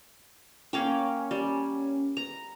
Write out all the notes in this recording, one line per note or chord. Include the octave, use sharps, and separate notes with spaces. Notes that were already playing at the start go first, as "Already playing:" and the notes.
A#3 C#4 F5 G5
G3
A#5